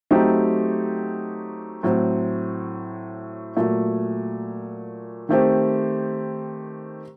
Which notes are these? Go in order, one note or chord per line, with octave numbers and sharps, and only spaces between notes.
F#3 A3 C4 D#4 G4
A2 F#3 C4
A#2 F#3 A3
D#3 A3 C4 G4 C5